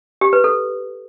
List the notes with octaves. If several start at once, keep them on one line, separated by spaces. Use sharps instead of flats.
G4
B4
A4